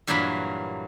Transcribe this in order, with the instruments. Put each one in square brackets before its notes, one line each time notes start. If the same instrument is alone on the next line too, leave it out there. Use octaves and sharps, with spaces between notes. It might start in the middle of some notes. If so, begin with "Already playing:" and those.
[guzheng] G2 A#2 E3 F#3 A#3 B5